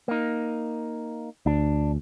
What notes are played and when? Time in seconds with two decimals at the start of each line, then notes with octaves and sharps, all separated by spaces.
0.08 A#3 D#4
1.46 D2 D4